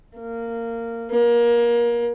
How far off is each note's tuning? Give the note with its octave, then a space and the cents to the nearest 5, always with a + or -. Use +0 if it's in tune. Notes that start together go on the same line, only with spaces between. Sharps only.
A#3 -15
A#3 +25